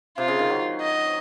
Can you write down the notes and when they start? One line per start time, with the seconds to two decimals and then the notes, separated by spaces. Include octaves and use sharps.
0.17 C3 F4
0.28 C#3
0.39 D#3
0.50 F#3
0.81 D#5